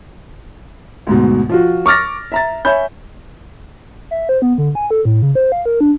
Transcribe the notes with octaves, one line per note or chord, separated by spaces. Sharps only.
D2 G#2 B2
F3 F4 F#4
C#6 D6 F6 A6 A#6
E5 A#5 A6
C#5 E5 G#5 B5 G6
E5
C5
B3
D3
G#5
A4
A2
C#3
C5
F5
A#4
D4